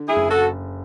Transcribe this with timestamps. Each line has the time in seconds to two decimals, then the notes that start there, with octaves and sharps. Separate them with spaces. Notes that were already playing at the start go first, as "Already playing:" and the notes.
Already playing: D3
0.08 E4 G#4
0.16 F#1
0.30 F#4 A4